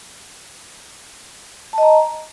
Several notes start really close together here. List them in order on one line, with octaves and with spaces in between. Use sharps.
A5 D#5 A#5